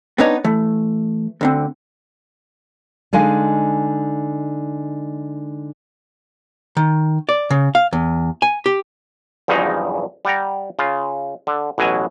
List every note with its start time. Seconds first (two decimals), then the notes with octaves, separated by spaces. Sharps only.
0.18 B3 C4 D4 D#4 B4 C#5
0.44 E3 A3
1.41 D2 D3 C4
3.13 D3 G#3 D#4 F5 G#5
6.77 D#3
7.29 D5
7.50 C#3
7.75 F5
7.93 E2
8.42 G#5
8.66 G4
9.48 E2 G2 C#3 F3 F#3 D#4
10.25 G3 F#5 G5 A#5
10.79 C#3 F4
11.47 D3
11.78 A1 B2 F#3 G#5